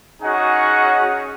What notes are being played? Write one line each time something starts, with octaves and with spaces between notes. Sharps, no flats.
C#4 D#4 F#4 G#4 D#5 F#5